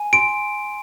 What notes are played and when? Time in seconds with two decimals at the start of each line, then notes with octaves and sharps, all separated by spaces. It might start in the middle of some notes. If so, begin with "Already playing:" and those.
Already playing: G#5
0.13 C6 D7